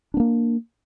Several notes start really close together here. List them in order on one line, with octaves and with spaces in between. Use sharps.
D4 B3 A#3